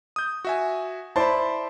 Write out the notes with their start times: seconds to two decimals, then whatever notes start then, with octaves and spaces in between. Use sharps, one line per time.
0.16 D#6 G6
0.45 F#4 E5 G#5
1.16 E4 C5 D5 A5 B5